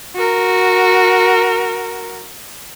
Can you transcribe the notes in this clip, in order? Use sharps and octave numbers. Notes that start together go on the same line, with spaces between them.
F#4 A#4